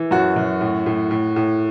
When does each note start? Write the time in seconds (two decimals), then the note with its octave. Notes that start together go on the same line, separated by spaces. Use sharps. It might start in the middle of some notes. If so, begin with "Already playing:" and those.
Already playing: E3
0.11 F#2 F#4
0.36 F#2
0.61 A2
0.86 A2
1.11 A2
1.36 A2